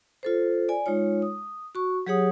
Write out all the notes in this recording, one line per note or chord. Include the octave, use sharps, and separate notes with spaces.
F4 A4 C5
D5 G#5
G#3 D#4 F4 C#5
D#6
F#4 C#6
F#3 G4 G#4 C#5 F#5 D#6